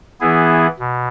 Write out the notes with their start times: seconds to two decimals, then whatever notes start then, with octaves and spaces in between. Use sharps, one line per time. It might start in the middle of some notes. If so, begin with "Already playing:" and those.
0.20 E3 B3 E4 G#4
0.79 B2